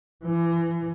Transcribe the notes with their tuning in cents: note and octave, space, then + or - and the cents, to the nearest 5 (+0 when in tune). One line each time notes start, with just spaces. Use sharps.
E3 +30